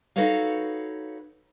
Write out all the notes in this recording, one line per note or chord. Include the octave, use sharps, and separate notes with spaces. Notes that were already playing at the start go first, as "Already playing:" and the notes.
D#4 F#4 A4 B4 C#5 F5